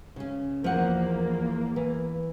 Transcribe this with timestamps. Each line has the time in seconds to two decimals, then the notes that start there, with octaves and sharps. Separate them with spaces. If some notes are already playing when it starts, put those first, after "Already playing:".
0.16 C#3 C#4
0.64 E2 F3 A#3 F#5
1.76 E3